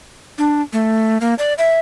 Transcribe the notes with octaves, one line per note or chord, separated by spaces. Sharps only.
D4
A3
A#3
D5
E5